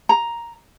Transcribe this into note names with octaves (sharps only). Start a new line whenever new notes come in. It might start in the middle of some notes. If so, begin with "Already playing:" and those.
A#5